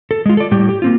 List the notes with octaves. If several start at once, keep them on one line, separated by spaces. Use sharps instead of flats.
A4
G#3 F4
A4 D5
A2 G3 G4
G4
A#3 C4 F4